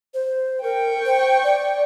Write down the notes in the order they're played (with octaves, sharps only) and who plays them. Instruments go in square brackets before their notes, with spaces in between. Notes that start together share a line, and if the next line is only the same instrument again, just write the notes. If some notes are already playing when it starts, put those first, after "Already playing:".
[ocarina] C5
[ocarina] A#4 [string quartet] G5 C#6
[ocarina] C5
D5